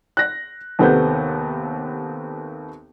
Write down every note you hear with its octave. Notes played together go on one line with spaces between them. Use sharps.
F#6 A#6
D#2 C3 B3 A4 C5 G6